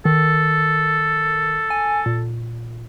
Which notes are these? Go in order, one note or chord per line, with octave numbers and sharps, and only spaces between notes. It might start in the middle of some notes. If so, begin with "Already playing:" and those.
D#3 A4
G#5
A#2